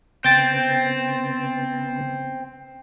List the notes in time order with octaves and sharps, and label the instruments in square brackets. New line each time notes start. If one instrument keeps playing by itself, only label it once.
[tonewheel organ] C#3 B3 [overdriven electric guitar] C4 [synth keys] G5 A6